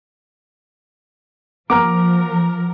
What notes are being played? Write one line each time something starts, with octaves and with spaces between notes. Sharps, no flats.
F3 A#3 A#4 F#5 A#5 D6 F6